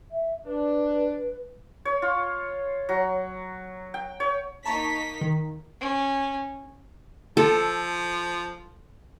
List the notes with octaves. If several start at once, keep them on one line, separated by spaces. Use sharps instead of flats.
E5
D4 B4
C#5
F4
F#3
G5
C#5
A#3 D#4 A5 A#5 C#6 B6
D#3
C#4
F3 A4